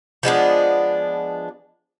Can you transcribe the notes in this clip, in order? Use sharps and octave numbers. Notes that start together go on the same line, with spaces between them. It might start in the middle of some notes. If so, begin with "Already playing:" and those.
F3 G#3 B3 D4